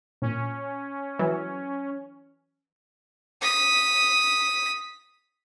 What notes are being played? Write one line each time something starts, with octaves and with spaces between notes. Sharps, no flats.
A#2 C#4
E3 F#3
D#6 B6